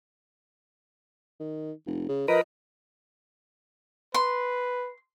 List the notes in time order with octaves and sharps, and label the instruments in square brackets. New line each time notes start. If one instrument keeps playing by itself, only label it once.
[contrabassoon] D#3
F1
C#3
[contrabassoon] F3 [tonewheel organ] A#4 B4 [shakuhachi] D#5
[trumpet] B4 [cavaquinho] C6